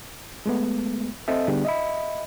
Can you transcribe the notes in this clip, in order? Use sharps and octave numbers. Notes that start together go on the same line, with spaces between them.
G#3 A3 B3
C4 A4 D#5 E5
D3 G3 B3 D4 G4 G#4
D#5 E5 B5